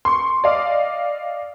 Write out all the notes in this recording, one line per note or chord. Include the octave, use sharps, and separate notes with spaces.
C6 C#6
D5 D#5 F5 D6